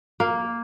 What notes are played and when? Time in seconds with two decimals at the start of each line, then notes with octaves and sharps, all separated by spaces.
0.20 A#3